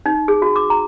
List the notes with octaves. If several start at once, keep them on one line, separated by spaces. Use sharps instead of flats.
D#4
G#4
F#4
D6
A#5